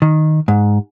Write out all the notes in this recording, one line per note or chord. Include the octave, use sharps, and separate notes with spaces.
D#3
G#2